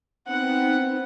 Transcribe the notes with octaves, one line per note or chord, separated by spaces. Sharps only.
B3 C4 D#4 F#5